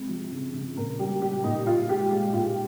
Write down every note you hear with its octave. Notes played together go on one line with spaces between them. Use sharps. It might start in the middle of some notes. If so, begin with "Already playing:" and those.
Already playing: C3 G#3
F3
C#3
C#3
A#2 A#4
G3 G4
G3 G4
A#2 D#4
A#2 F4
G#3 G4
G#3 G4
A#2 F4